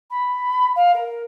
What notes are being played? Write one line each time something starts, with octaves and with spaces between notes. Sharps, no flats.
B5
F5
A#4